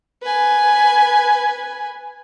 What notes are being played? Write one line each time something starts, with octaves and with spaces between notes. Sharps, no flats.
B4 G#5